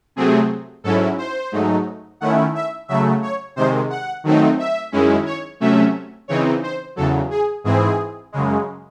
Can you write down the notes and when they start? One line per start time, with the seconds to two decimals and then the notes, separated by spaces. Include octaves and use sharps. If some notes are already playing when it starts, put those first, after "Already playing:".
0.16 C3 F#3 A3 C4 G#4
0.84 G#2 F#3 C#4 E4 A4
1.18 C5
1.52 G#2 F#3 A3 D#4
2.21 D#3 A3 C#4 E4 F#5
2.55 E5
2.88 C#3 F#3 A3 E5
3.22 C#5
3.56 C3 D#3 G#3 C5
3.90 F#5
4.24 D#3 F#3 A3 C4 D#4
4.59 E5
4.92 F#2 D#3 G#3 C#4 E4
5.26 C#5
5.60 C3 F#3 A3 C#4 E5
6.28 C#3 E3 C4 D#4 C#5
6.63 C5
6.96 E2 C#3 F#3 A4
7.30 G#4
7.64 G#2 E3 C4 E4 G#4
8.32 F#2 C#3 G#3